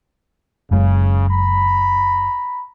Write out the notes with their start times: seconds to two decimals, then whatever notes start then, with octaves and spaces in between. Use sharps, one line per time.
0.71 F#1 F#2 C#3 G#3
1.30 A#5 B5